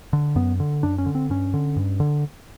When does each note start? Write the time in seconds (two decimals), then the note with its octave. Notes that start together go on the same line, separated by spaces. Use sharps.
0.13 D3
0.36 F#2 B3
0.60 D3
0.83 F#2 D4
0.98 C#4
1.06 D3
1.15 C4
1.30 G2 C#4
1.54 D3
1.76 G2
2.00 D3